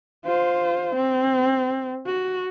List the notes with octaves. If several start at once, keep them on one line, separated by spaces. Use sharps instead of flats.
F4 C5
C4
F#4